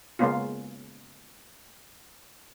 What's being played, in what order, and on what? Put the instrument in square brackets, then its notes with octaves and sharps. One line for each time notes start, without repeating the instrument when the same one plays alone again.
[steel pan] C#3 G#3 A#3 B3 C#4 F4